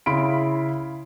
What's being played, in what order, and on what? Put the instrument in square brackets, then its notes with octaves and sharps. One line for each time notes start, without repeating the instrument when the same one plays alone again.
[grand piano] C#3 E4 F5 B5 C6 D7